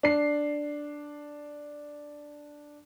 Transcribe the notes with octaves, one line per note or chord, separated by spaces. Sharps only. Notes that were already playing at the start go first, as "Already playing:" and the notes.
D4 C7